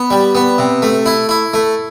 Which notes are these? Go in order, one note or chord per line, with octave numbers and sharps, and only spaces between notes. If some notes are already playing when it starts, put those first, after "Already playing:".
Already playing: B3
G3
B3
C3
A3
E4
E4
A3